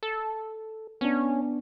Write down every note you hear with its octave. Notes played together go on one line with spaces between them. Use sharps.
A4
B3 C#4 D4